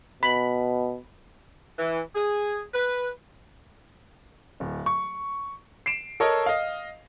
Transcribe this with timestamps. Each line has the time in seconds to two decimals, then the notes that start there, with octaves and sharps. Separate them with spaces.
0.23 B2 B5
1.79 E3
2.14 G#4
2.73 B4
4.60 D1
4.86 C#6
5.86 C7 D7 E7
6.20 A4 A#4 C#5 D#5
6.46 D#5 F5